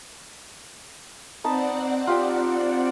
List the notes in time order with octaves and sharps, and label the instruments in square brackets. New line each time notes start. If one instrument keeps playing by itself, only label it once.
[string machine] C4 D5 F#5 [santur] D#4 B4 A5
[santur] F4 G4 G5